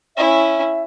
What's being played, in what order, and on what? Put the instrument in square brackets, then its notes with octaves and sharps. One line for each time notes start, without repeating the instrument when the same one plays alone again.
[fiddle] C#4 E4 [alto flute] E5